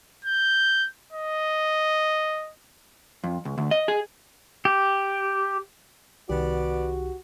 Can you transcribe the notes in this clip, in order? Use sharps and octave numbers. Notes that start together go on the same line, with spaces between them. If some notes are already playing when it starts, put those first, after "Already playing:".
G6
D#5
F2
C#2
D2
D#5
G#4
G4
C2 D#3 B3 F#4 G4 D5